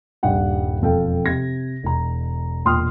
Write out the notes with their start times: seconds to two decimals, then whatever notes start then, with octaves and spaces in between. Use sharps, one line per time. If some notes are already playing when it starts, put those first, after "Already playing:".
0.23 D#1 G2 F#5 G5
0.82 E1 F2 A4 F5 G5
1.26 C3 G#6 A#6
1.83 E1 A#5
2.65 E1 A#2 G5 C6 D#6 F6